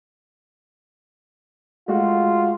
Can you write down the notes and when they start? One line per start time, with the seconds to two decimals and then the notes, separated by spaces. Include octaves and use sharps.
1.88 G#3 A3 F4 F#4